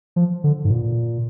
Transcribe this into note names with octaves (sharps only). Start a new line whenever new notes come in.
F3
D3
G#2
A#2